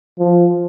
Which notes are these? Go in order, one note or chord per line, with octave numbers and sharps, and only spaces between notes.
F3